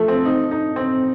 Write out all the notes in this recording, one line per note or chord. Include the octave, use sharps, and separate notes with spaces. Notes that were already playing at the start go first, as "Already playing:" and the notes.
Already playing: F3 A3
C4
D#4
D#4
C4